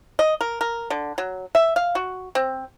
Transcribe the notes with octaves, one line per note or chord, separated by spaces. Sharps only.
D#5
A#4
A#4
D3
F#3
E5
F5
F#4
C4